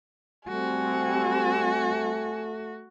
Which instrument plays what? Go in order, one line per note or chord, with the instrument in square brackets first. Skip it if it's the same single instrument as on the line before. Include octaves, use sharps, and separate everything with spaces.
[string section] G3 C4 [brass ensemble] A3 [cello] F#4 [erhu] G#5